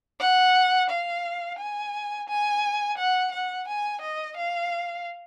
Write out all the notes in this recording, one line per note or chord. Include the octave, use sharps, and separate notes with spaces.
F#5
F5
G#5
G#5
F#5
F#5
G#5
D#5
F5